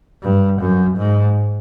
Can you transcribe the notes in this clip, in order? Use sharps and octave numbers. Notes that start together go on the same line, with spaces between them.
G2
F#2
G#2